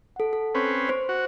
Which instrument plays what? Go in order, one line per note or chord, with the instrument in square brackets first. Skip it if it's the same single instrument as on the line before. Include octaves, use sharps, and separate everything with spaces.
[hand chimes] A4 F#5
A4
[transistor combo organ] C4 C#4 B4
[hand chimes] C5
[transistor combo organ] F#4